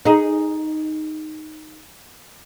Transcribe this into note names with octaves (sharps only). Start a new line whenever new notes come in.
D#4 G#4